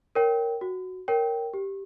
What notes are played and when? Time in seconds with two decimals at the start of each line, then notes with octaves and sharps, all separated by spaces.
0.15 A#4 C#5 G5
0.61 F#4
1.08 A#4 C#5 G5
1.54 G4